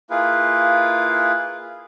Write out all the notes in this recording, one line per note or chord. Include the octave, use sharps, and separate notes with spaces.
A#3 E4 F4 G#4 B4 F5